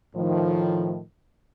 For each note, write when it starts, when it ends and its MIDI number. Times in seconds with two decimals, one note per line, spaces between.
0.15 1.00 45
0.15 1.00 51
0.15 1.00 53